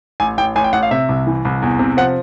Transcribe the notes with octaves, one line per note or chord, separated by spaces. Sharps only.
A1 G#5
A1 G5
A1 G#5
G5
A1 F#5
F5
C3 E5
C2
E3
C2
E2
C3
F3 F#5